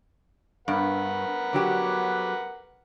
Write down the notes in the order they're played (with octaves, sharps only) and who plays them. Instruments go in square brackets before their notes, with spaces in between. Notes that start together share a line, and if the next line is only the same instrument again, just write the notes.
[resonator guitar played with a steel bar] G2 [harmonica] A#4 B4 F#5
[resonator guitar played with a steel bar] D3 F#3 G4